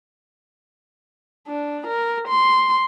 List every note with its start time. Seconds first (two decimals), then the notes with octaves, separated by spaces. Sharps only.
1.48 D4
1.87 A#4
2.28 C6